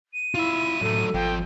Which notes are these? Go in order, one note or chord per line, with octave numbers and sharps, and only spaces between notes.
D#7
E4 F4 E5
F#2 A2 A3 A4
G#1 F2 G5